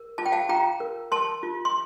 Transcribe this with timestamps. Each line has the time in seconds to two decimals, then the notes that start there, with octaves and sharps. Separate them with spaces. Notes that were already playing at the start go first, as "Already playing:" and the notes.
Already playing: A#4
0.18 F4 A5
0.26 G5
0.32 F5 A5
0.49 F4 G5 A#5
0.80 A#4
1.12 A#4 A5 C6
1.43 F4
1.65 C6